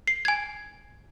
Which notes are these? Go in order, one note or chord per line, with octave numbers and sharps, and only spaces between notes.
C7
G#5 G#6